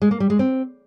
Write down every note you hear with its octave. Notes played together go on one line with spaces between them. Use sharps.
G#3
A#3
G3
G#3
C4